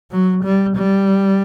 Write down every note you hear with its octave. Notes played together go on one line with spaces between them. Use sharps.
F#3
G3
G3